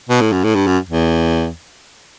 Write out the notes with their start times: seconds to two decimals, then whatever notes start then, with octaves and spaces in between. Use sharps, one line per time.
0.09 B2
0.21 A2
0.32 F#2
0.44 A2
0.55 G2
0.66 F#2
0.89 E2